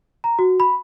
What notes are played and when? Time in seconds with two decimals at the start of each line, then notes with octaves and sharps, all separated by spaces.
0.24 A#5
0.39 F#4
0.60 B5